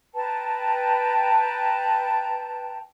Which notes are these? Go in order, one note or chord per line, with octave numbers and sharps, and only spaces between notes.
B4 G5 A5 A#5